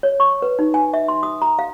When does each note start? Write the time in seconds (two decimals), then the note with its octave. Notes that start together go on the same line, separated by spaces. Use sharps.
0.03 C#5
0.20 C#6
0.42 B4
0.59 D#4
0.74 G#5
0.94 E5
1.08 C6
1.23 D#6
1.42 A#5
1.59 F5